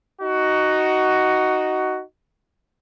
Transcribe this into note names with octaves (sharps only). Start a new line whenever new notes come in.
D#4 F#4